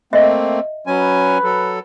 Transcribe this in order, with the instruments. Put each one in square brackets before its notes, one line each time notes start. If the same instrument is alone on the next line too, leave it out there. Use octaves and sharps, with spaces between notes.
[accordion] A3 A#3 C4 [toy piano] D#5 E5
[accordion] F#3 C#4 G#5 [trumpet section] B4
[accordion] F#3 A4